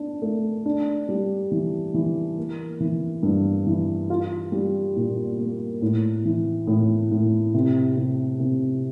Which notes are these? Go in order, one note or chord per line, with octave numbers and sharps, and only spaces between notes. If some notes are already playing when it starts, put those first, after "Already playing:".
Already playing: D4
A3
D4
G3
E3
E3
A#3
E3
G2
E3
F4
G3
A#2
A#3
A2
E3
A2
A2
C3
C3
C3